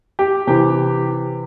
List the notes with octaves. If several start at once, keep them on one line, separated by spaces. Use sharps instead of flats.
G4
C3 E3 G4